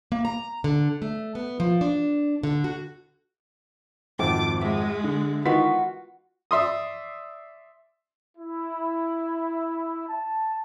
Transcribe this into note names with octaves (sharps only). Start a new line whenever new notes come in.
A#3
A#5
D3
A3
B3
F3
D4
D3
F#4
G#1 F2 A4 D6
G#3 E5
D3
D#3 E3 B3 F4 F#4 B6
D5 E5 C6 D#6
E4
A5